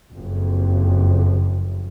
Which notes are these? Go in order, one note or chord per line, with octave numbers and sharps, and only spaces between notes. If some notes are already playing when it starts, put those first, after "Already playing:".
F#1 F2